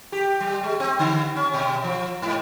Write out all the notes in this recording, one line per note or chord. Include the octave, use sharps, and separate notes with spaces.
G4
G3
G#3
C4
D3
C#4
B2
F3
G#2